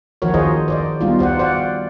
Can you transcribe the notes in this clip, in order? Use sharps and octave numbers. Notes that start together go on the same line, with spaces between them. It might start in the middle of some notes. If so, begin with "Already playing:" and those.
D#3 F3 F#4 A#4 C#5
D#4 F4 G#4 C5 D#5
C5 D5 D#5
G3 B3 D#4 F4
F#4 C5 D5 F#5
C5 D5 F5 F#5